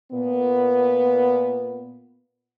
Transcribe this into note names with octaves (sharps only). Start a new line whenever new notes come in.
A#2 B3